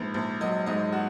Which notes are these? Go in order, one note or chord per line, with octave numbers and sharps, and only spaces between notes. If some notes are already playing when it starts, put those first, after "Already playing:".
Already playing: A#1 G#2 B4
A#1
F#3 D#5
G#2 D#5
F#4